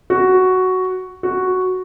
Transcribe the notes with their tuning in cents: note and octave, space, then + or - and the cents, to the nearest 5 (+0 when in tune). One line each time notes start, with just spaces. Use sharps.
F#4 +5
F#4 +0